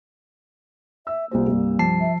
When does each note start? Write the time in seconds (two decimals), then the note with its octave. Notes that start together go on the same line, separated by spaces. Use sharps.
1.07 E5 E6
1.31 C2 A#3 F4 C5
1.48 C2 G2
1.79 F3 A5 C7
2.00 E5